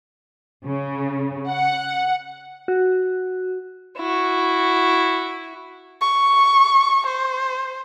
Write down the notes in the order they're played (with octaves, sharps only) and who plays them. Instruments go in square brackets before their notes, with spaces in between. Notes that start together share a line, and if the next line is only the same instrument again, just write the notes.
[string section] C#3
F#5
[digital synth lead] F#4
[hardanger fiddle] E4 F#4
[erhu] C#6
C5